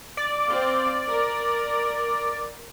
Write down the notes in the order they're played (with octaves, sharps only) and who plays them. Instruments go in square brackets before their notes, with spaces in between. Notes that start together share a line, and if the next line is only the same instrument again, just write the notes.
[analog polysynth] D5
[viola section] C4 F5
A#4